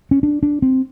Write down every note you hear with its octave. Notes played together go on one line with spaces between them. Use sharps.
C#4
D4
D4
C4